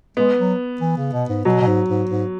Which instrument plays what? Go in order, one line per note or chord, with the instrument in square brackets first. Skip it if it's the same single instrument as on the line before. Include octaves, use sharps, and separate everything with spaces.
[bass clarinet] G#3 [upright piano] B3
[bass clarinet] F#3
E3
C#3
B2
G#2
[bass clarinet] B2 [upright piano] F#3
[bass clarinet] B2
G#2
G#2
G#2